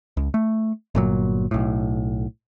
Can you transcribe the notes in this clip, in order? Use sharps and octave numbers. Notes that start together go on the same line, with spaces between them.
C#2
A3
G1 A#2 F#3
B1 A2